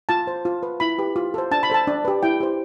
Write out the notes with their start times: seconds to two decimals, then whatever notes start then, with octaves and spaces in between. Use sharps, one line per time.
0.09 F4 A5
0.27 C5
0.45 F4
0.63 B4
0.80 E4 B5
0.99 G4 B4
1.16 F4
1.34 A4 C5
1.51 D4 A5
1.63 B5
1.70 A4 C5 A5
1.87 D4
2.05 G4 B4
2.23 E4 G5
2.40 G4 C5